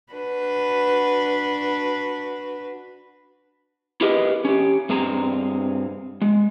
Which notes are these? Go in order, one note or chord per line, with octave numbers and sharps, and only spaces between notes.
D4 F#4 B4
E4 G4 G#4 A#4 B4 D#5
C#4 G4
G2 C4 G#4 A#5
G#3